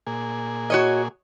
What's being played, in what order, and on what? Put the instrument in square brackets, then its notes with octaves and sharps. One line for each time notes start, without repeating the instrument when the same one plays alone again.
[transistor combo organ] A#2 G#4
[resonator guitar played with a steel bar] F#4 C#5 D#5